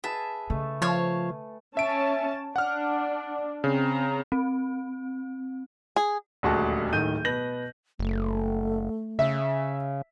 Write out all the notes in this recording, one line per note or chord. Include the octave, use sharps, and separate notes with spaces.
G#4 B4 E5 A5
C#3 A3
F3 C#5 F5 A5
C#4 E5 A5 D7
D4 F#5 F6
C#3 C4 A#5
C4
G#4
D#1 D2 G#3 F#4 G#4 A5
D1 A2 D#3 G6 D#7
B2 B4 A#6 F#7
F#1 A3
C#3 E5